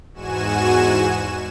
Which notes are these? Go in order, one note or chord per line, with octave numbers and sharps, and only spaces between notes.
E2 G#2 F#4 G#5 E7